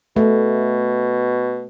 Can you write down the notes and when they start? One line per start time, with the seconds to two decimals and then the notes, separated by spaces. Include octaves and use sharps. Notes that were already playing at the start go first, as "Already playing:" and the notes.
0.16 B2 A3